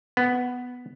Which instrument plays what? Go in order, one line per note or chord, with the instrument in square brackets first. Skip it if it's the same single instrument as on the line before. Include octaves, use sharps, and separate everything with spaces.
[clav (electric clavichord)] B3